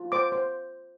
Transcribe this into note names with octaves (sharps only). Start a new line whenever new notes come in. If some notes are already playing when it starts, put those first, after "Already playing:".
Already playing: F4
C5 D6
C5